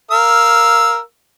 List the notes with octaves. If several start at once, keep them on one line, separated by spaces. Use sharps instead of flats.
A#4 F5 E6